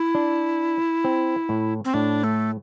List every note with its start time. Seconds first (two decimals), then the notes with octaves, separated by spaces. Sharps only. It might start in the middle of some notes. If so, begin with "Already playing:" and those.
Already playing: E4
0.15 D4
1.04 C4
1.49 A2
1.85 C4
1.94 A2 D4
2.24 A3